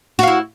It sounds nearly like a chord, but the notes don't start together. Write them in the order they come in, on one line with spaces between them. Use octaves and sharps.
F#4 F5 E4